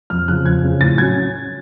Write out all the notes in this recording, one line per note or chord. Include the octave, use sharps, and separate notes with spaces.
F2 F6
C#3 F3 F#6
F2 G#6
C#3 F3
A2 A6
F#3 C#4 G#6